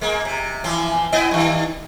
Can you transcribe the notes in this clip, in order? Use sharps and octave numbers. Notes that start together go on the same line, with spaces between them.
G#3 A#3
C3
E3 F3 C4
B3 E4 D#5
G2 D#3